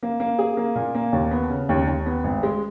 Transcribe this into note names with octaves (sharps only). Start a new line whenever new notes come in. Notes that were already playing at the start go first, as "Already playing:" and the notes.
A#3
A#3
G#4
A#3
A#2
A#3
D#2
B3
C#3
D#2
D#2
B3
G#1
G#3